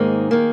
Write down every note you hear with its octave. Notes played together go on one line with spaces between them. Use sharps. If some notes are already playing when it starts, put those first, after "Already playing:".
Already playing: G#2 D#3 A#3 G#4
D#3 A#3